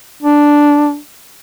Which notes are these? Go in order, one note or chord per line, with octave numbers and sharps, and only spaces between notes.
D4